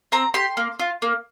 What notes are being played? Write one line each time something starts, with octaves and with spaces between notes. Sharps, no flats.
C4 A#5
G4 C6
A#3
F4
A#3